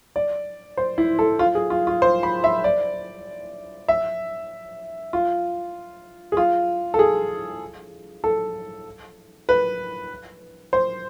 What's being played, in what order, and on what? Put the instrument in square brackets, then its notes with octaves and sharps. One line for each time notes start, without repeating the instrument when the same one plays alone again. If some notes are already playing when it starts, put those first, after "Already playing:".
[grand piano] D5
C5
E4
A4
F4
G#4
F4
F4
C5
B5
E5
D5
E5
F4
G#4
F4
A4
G#4
A4
B4
C5